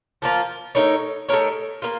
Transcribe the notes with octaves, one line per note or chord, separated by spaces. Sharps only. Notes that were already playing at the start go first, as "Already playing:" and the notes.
F3 A#3 F4
A3 D#4 A#4 C#5
A3 D#4 A#4 C#5
A#3 F4